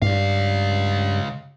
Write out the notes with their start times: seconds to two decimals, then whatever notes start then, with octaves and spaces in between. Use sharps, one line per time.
0.02 C#2 G2 F5